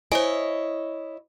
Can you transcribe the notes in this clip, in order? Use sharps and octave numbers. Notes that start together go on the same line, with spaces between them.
E4 C5 C#5 D#5 G#5